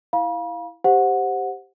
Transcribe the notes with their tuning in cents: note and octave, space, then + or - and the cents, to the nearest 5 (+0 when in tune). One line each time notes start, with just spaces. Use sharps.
E4 +0 F5 +5 B5 -40
G4 +0 C5 +0 F#5 -15